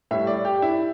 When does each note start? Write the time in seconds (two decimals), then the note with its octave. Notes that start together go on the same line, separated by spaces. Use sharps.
0.11 A2 G3 E5
0.27 D5
0.45 G4
0.62 E4